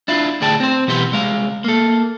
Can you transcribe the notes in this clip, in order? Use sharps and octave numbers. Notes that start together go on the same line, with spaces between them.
D4 E4 F4
D2 A2 G#4 D5 G5 A5
C4 C5
B2 E3 B3 G4 C6
C2 G#3 F5
A#3 A4